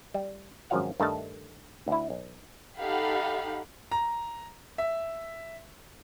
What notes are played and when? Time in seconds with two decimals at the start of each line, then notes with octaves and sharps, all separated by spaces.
0.14 G3
0.70 G#1 F#2 F3 F#3 F5 F#5
1.00 G2 D#3 A3 D4 D#4 A5
1.88 D2 E4
2.10 B1
2.78 D#4 G4 A4 F5 F#5 B5
3.91 A#5
4.78 E5